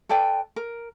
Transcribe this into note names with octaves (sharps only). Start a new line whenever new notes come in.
A4 B4 D5 G5
A#4